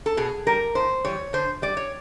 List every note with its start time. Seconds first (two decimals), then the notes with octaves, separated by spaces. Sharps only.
0.06 A4
0.17 B2 G#4
0.47 G3 A#4
0.75 A2 C5
1.05 E3 G3 C#5
1.33 D3 C5
1.62 G3 D5
1.77 C#5